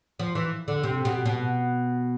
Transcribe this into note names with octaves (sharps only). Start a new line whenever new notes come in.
F3
E3
D3
C3
B2
B2